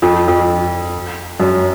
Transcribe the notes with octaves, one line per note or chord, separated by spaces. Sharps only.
F2
F2
F#2